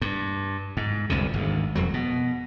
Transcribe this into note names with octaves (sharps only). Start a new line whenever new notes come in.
G2
G#2
G1 C2 F2 C3
G#1 D2
E1 F2 F#3
B2